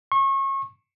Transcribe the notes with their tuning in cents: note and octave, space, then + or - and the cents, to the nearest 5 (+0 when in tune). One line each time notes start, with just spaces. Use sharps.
C#6 -30